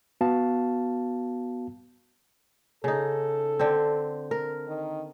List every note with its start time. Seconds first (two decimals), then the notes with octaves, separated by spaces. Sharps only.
0.21 B3 F#4 F5 A5
2.84 C#3 D#4 A4
3.59 D3 C4
4.31 A#4
4.68 D#3